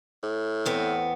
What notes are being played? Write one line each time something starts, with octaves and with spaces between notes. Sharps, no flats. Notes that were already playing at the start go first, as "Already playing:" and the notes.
A2
E2 B3 C4